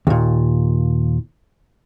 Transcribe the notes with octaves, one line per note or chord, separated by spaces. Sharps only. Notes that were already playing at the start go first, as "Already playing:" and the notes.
D#2 A#2